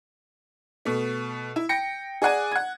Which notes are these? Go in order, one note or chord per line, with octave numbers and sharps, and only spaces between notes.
B2 A3
E4
G5 A#6 C#7
G#4 D5 F#5 G#5
F#5 G#6